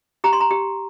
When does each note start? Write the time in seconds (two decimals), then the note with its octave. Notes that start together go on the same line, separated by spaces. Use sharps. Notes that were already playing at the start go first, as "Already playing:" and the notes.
0.24 G4 A#5
0.33 C6
0.41 A#5
0.51 G4